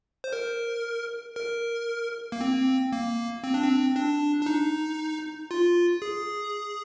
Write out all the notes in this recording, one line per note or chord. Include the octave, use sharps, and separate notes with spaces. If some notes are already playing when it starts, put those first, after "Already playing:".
C5
A#4
A#4
A#3
C4
A#3
C4
D4
C4
D4
D4
D#4
F4
G#4